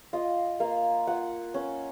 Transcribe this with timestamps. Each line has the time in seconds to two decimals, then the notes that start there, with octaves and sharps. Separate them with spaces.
0.13 F4 D#5
0.60 A#3 F5
1.07 F4 F#5
1.54 C#4